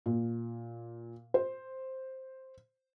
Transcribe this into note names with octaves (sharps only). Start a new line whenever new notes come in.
A#2
C5